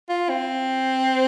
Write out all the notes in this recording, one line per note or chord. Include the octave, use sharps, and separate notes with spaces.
F4
C4